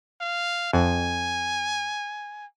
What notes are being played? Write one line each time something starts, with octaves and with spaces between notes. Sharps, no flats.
F5
F2 G#5